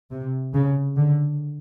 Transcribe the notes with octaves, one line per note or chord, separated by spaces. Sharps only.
C3
C#3
D3